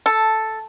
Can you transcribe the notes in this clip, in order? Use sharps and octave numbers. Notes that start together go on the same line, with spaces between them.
A4